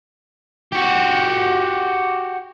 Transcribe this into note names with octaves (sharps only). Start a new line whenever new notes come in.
F#4 G4